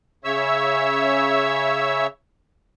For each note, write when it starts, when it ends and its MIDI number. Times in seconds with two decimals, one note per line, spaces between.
0.24 2.07 49
0.24 2.07 73
0.24 2.07 76
0.24 2.07 88